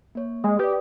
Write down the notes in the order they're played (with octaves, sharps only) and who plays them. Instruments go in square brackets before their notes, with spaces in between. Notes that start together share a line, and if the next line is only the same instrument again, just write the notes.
[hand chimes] A#3 C#5
[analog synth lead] G#3 [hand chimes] D#6
[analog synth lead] G4 [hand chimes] B4 D5